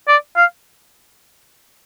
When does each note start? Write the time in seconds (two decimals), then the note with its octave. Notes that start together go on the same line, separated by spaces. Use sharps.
0.08 D5
0.36 F5